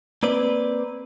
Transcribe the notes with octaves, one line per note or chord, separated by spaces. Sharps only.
A#3 C4 B4 D5